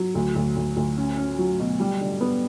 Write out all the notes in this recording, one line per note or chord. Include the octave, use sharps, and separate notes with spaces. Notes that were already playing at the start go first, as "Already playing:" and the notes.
Already playing: F#3
D2
D2
D2
D2
C#4
C#4
F#3
B2
G3
D3
B3